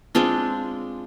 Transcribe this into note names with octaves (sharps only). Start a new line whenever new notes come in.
G#3 C4 D4 F4